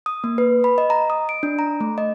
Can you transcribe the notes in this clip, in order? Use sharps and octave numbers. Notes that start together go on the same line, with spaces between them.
D#6
A#3
B4
B5
D#5
A#5
D#6
D7
D4
A#5
A3
D#5